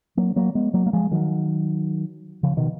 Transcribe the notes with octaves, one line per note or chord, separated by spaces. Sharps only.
F#3 A#3
F#3 A#3
G#3 B3
F#3 A#3
A#3
F3 G#3
D#3 F#3
C#3 F3
B2 D#3